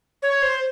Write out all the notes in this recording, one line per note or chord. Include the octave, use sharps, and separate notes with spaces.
C#5
C5